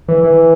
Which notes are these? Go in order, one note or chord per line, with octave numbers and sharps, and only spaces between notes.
E3
E3